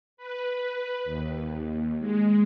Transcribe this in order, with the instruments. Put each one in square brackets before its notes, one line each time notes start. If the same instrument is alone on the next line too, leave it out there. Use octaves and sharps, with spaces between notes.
[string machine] B4
D#2
G#3